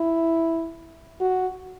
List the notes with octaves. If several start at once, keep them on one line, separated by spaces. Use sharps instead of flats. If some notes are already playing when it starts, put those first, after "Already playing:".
Already playing: E4
F#4